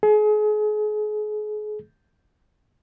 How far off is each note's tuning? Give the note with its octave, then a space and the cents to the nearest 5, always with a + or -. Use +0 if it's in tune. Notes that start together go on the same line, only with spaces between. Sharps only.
G#4 +35